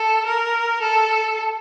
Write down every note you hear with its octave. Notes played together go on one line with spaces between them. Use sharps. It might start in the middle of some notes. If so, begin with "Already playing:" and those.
Already playing: A4
A#4
A4